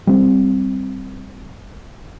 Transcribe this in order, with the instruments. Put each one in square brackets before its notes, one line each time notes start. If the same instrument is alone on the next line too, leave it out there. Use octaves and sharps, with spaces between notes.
[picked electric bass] G3 C4